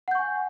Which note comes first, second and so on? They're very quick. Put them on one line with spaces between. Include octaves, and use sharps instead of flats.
F#5 G6 C#6 G#5